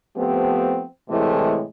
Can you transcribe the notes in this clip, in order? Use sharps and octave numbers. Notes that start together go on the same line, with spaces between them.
F3 A3 B3 C4 G4
A2 C3 E3 G#3 A3